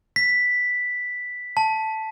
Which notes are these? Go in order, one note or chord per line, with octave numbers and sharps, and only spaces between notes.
B6
A5